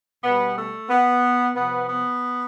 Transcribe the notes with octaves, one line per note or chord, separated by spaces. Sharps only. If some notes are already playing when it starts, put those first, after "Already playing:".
B2 G3 B3
A3
B3
C3 F3 B3
B3